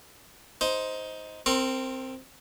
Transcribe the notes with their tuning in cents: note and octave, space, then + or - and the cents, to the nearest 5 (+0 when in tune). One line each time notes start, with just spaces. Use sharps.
D#4 +15 C5 +0
C4 +0 A#4 -20 C6 +30